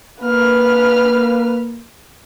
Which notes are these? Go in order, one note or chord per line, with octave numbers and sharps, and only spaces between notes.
A#3 B4 F6